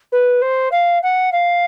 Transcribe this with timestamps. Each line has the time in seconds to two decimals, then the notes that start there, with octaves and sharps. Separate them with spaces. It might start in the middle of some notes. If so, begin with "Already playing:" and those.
0.12 B4
0.42 C5
0.72 F5
1.03 F#5
1.32 F5